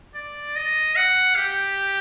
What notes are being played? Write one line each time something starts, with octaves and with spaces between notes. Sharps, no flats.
D5
D#5
F#5
G4